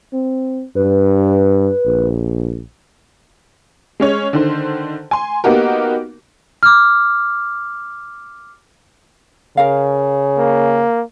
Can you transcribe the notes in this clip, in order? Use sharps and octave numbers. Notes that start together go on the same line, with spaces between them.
C4
G2 B4
A#1
G#3 C#4 C#5
D3 D#3 C5
G#5 C6
A#3 B3 D#4 F#4 G4 A#4
D6 F6
C#3 A#4 F5
A#3